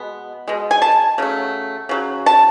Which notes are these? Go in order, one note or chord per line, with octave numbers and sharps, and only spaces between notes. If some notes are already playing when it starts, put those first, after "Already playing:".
Already playing: B2 G#3 B3
B2 G#3
G#5
A5
C#3 F#3 A3
C#3 F#3
A5